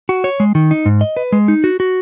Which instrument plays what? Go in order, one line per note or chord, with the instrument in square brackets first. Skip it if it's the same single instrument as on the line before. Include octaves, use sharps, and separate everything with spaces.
[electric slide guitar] F#4
C#5
G#3
D#3
D#4
G#2
D#5
B4
G#3
D#4
F#4
F#4